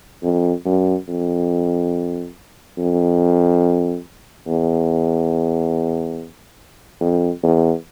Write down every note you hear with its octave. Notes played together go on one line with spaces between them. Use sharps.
F2
F#2
F2
F2
E2
F2
E2